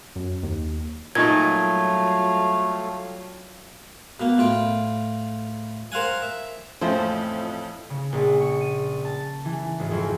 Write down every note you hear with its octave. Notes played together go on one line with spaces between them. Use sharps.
F#2
D#2
A#2 F#3 G3 A3 D#4 F4 C#6 G#6
B2 A#3
A2 F4 G5
A#4 C5 F5 F#5 G#5
E5
F2 A2 E3 F3 A3 C4 F4 C5
C#3
A#1
C#6
D#7
A5
E3
G#1
F2